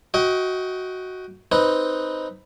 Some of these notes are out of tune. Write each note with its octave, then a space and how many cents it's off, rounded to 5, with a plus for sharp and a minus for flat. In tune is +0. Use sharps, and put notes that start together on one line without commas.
F#4 +0 D#5 +30 G5 -10
C4 +0 D#4 +0 B4 +0